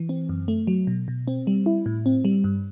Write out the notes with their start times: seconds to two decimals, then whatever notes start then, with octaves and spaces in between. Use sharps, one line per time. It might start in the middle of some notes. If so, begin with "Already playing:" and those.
Already playing: E3
0.09 C4
0.29 F#2
0.48 A3
0.67 F#3
0.87 B2
1.08 B2
1.28 C4
1.47 G3
1.66 E4
1.86 A2
2.06 C4
2.25 G3
2.44 G2